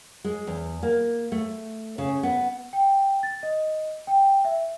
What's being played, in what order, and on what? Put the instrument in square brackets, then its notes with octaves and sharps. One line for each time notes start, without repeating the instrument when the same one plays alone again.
[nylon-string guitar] G#3
E2
A#3
A3
C#3
B3
[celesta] G5
A6
D#5
G5
E5